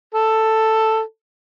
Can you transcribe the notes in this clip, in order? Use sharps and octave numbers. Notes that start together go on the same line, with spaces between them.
A4